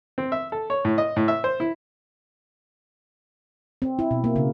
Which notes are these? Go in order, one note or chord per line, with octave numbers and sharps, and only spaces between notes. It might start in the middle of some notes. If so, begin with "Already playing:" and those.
C4
E5
A4
C#5
A2
D#5
A2
E5
C5
E4
C4
E4
B2
A#3
C#3